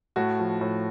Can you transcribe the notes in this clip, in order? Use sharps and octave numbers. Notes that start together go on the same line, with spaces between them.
A2 F#4
F3
A2